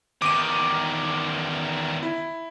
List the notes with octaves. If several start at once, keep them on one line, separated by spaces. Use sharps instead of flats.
E2 D#3 D6 D#7
E4